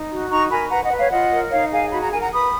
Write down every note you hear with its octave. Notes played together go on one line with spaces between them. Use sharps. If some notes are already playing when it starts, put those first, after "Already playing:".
Already playing: D#4
F#4
D#4 A#5 C#6
A#4 G#5 B5
B4 F#5 A#5
D#5 F#5
B4
C#5 F5
F4 D#5 F#5
A#4
D#4 C#5 F5
G#4 F5 G#5
F#4 B5
A#5
A#4 G#5
F#5 A#5
B4 B5 D#6